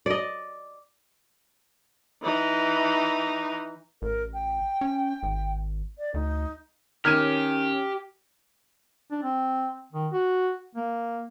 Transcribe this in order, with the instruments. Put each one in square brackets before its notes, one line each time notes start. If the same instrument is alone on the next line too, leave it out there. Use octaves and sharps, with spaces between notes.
[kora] D5 D#5
[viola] E3 D#4
[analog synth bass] A1 [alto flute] A#4
[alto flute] G5
[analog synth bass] C#4
G#1
[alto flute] D5
[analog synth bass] D2 [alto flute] D#4
[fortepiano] D#3 [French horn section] C#4 [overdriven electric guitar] G4 [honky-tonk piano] F6 G#6 D#7
[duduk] D4
C4
D#3
F#4
A#3